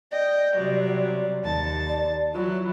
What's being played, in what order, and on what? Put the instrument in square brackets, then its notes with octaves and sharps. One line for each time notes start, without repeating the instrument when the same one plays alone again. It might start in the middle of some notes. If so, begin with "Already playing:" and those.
[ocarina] D5 [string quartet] D#5 G5
[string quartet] C3 F#3 G3
D#2 A5 A6
[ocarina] D5
[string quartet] E3 F#3 E4 [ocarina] F4